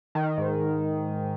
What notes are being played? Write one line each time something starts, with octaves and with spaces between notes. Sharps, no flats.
D#3
G#2